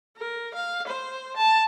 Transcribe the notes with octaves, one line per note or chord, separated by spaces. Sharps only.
A#4
F5
C5
A5